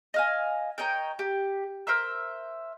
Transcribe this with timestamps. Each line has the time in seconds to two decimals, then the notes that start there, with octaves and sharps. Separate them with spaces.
0.14 D#5 F5 G#5
0.78 A#4 C#5 D#5 G5
1.19 G4
1.87 A#4 C5 E5 E6